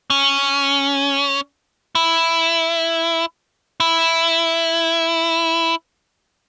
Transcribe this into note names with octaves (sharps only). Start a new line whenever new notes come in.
C#4
E4
E4